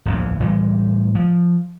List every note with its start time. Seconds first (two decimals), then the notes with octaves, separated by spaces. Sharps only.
0.05 D1 A#1 E2
0.40 A2 E3 G3 G#3
1.15 F3